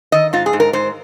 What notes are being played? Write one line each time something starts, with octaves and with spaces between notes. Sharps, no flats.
D#3 D#5
G#2 F4
G#4
G#2
A#4
G#2 C5